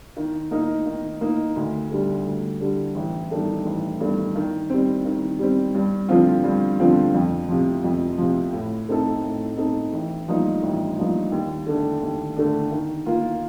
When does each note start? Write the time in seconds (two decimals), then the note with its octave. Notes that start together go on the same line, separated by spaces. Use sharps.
0.17 D#3
0.51 A#3 D#4 A#4
0.86 D#3
1.21 A#3 D#4 A#4
1.56 D2
1.91 D3 G3
2.26 D2
2.61 D3 G3
2.95 A1
3.30 G2 D#3 A3 D4
3.65 A1
4.00 G2 D#3 A3 D4
4.35 D#3
4.70 G3 C4
5.05 D#3
5.39 G3 C4
5.74 G2
6.09 D3 F3 C4 F4
6.43 G2
6.80 D3 F3 C4 F4
7.14 F2
7.48 C3 F3
7.84 F2
8.18 C3 F3
8.53 A2
8.89 A3 C4 D#4 A4
9.23 A2
9.57 A3 C4 D#4 A4
9.93 A1
10.28 G2 F3 A#3 D#4
10.62 A1
10.98 G2 F3 A#3 D#4
11.32 D#2
11.66 D3 A3 D4
12.02 D#2
12.36 D3 A3 D4
12.71 D#3
13.06 A#3 F4